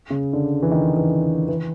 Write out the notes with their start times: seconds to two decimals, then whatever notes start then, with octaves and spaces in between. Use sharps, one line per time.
0.10 C#3
0.33 D3
0.62 E3
0.71 D#3
0.96 E3
1.48 E3